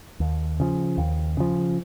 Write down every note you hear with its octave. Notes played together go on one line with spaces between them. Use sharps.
D#2
C#3 F3
D#2
C#3 F3